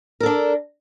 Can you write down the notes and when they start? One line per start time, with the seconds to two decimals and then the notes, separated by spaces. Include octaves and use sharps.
0.20 A#4
0.23 A4
0.26 D4